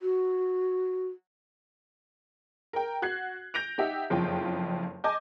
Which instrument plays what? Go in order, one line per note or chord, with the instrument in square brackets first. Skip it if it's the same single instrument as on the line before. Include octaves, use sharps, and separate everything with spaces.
[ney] F#4
[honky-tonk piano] A#4 G5
F#4 F#6 G#6 C7
G6 A#6 D7 F7
D#4 G4 E5 F#5
F#1 F2 F4 G5
D#5 G#5 A5 D6 G6